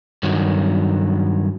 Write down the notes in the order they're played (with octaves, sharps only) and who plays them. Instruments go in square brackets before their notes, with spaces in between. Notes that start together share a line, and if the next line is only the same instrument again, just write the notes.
[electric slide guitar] G2 D#3 F#3